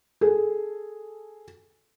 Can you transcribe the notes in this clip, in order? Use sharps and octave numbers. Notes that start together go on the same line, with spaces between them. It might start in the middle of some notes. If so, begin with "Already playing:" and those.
G#4 A4